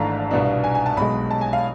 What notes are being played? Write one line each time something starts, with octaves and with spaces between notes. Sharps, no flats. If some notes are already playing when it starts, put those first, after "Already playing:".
Already playing: G#1 G#2 E3 A3 D4 F5 A5
C2 B2 B3 D4
G#5
G#5
A5
B1 B2 G#3 B5
A5
G#5
F5